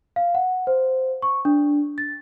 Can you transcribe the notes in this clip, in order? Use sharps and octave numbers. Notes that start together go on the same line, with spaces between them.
F5
F#5
C5
C#6
D4
A6